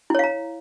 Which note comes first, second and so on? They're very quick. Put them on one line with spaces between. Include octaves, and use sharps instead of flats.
E4 C#5 F5 A#5